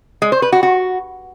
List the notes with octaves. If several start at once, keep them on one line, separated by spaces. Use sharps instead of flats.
G#3
C5
B4
F#4
F#4